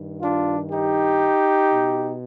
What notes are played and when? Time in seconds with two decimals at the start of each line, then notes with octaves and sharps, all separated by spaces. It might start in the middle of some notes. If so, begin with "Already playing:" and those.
Already playing: G2 D#3
0.21 D4 F4
0.72 D#4 G4
1.73 B2